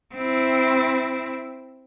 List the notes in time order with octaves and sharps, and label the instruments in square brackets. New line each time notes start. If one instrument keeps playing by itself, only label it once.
[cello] C4 E4